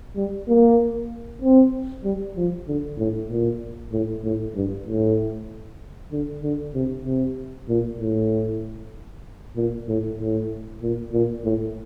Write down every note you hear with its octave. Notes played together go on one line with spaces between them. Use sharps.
G3
A#3
C4
G3
F3
D3
A2
A#2
A2
A2
G2
A2
D3
D3
C3
C3
A#2
A2
A#2
A2
A2
A#2
A#2
A2